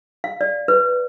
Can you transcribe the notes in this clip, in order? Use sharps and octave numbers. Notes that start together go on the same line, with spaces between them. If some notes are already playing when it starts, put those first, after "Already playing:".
F5
D5
B4